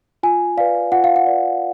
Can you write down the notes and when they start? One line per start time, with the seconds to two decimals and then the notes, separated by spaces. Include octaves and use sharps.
0.23 F4 G#5
0.57 B4 D5 F5
0.92 F4 F#5
1.04 F5
1.16 F#5
1.26 B4 D5